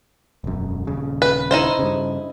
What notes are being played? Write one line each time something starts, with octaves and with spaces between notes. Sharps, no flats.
E1 F#2
D#1 C#3
B4
D#4 E4 C5
G2 C#3